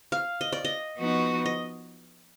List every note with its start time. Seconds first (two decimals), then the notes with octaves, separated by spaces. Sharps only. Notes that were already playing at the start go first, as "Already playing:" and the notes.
0.12 F5
0.41 D#5
0.52 D5
0.65 D#5
0.98 F3 B3 D#4 F#4 B4
1.46 D#5